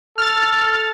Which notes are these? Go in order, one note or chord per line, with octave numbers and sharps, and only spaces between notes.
A4 F6 A6